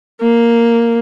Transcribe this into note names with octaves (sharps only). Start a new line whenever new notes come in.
A#3